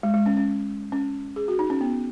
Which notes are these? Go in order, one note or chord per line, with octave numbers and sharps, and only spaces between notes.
G#3
G#3
C#4
C#4
C#4
G#4
F#4
D#4
C#4
B3